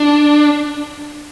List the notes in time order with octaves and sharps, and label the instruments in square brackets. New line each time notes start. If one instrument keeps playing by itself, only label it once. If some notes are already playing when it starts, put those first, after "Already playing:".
Already playing: [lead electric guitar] D4